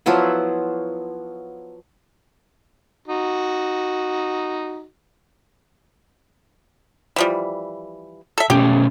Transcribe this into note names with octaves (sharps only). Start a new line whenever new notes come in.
F3 F#3 B3 E4
D#4 F#4
E3 F3 G3
A4 E5
B2 A3 C#4 G4